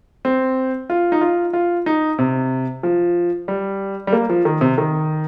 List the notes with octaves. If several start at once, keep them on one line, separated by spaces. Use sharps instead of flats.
C4
F4
D#4
F4
F4
D#4
C3
F3
G3
G3
A#3
F3
D#3
C3
D#3